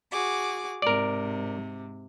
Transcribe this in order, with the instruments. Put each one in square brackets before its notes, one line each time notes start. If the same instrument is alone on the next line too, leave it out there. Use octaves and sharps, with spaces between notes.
[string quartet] F#4 G#4 D6
[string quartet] G#2 C3 [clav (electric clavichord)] A#4 D5